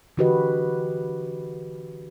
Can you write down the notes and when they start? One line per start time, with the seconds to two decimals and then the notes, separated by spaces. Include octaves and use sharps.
0.17 D3 E3 F#4 G4 B4 D#5